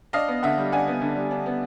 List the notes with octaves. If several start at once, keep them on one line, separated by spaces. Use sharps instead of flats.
D4 D#5 F5
B3
D3 E5 F#5
G3
D4 F#5 G#5
B3
D3
G3
D4
B3